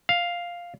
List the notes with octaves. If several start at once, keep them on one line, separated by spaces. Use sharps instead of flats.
F5